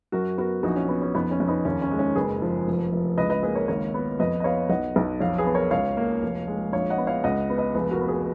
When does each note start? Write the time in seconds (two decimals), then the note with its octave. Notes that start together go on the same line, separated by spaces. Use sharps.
0.12 F#2 F#4 A#4
0.38 B3 F#4 A#4
0.63 A#1 D#4 F#4
0.76 C#4
0.89 B3
1.02 C#4
1.14 F2 B3 D#4
1.31 C#4
1.40 F2
1.48 B3 D#4
1.65 D#2 C#4
1.82 C#4
1.91 G#3
1.99 C#4
2.16 F#1 G#4 B4
2.42 F3
2.68 F1
2.92 F1
3.17 C#2 B4 D#5
3.30 B4 D#5
3.43 A#3 G#4 B4
3.55 A#4 C#5
3.68 G#1 A#4 C#5
3.94 B3
4.19 F2 B4 D#5
4.40 D#5
4.44 B3 C#5 F5
4.69 B1 D#5 F#5
4.96 B1
5.20 F2 C#5 F5
5.38 G#4 B4
5.47 B3
5.55 A#4 C#5
5.71 C#2 C#5 F5
5.97 A#3
6.22 F1
6.48 G#3
6.73 A#1 C#5 F5
6.90 D#5 F#5
6.98 B3
7.07 C#5 F5
7.24 C#2 D#5 F#5
7.50 B3
7.57 B4 D#5
7.74 F1 G#4 B4
7.91 F#4 A#4
8.01 B3
8.08 G#4 B4